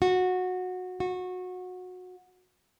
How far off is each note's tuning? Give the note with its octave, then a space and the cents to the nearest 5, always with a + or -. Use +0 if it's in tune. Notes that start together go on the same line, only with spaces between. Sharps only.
F#4 -15
F#4 -20